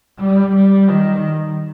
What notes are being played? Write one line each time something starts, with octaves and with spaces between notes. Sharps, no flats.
G3
G3
D#3